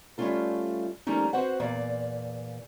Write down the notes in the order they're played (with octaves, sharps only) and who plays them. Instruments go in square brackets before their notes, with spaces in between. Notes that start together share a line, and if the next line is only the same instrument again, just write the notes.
[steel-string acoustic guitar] G3 A3 C4 C#4 F4 A4
F3 G3 A3 A#3 C#4 D#4
C4 F#4 B4 C5 F#5
E2 A#2 D5 F5